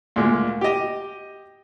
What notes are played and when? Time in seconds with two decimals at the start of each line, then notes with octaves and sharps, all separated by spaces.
0.16 D2 A#2 G#3 A#3
0.61 G4 D#5